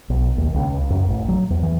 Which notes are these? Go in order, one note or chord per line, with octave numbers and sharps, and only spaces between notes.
B1
D#2
C#2
F#2
A1
F#3
E2
E3